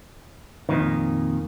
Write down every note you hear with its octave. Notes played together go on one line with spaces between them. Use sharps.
F2 A#2 D#3